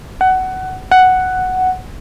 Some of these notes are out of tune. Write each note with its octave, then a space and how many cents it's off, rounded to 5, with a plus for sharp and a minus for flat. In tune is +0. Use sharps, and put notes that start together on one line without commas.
F#5 +20
F#5 +5